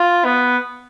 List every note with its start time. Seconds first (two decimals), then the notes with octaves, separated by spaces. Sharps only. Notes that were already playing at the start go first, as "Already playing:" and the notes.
Already playing: F4
0.25 B3